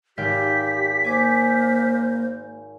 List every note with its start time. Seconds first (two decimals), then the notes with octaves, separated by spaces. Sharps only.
0.18 G#1 G4 F5 G5 B6
1.04 A#3 C5 G#5 D6